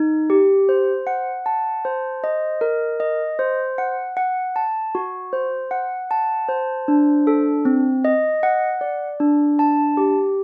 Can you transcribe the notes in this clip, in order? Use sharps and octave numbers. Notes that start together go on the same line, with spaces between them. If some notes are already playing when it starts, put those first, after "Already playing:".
Already playing: D#4
G4
C5
F#5
A5
C5
D#5
A#4
D#5
C5
F#5
F#5
A5
F#4
C5
F#5
A5
C5
D4
A4
C4
D#5
F#5
D5
D4
A5
G4